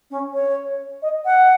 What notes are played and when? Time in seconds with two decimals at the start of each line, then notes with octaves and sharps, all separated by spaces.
0.11 C#4
0.34 C#5
1.02 D#5
1.25 F#5